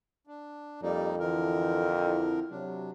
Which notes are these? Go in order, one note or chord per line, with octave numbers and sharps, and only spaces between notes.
D4
F2 G3 A#3 D#4 F4 G4 D5
D3 E3 F3 A#4
C4 E4
C3 F#3 D4